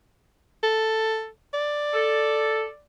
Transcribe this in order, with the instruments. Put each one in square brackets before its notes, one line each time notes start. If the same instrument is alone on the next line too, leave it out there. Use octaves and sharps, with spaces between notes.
[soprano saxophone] A4
D5
[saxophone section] A4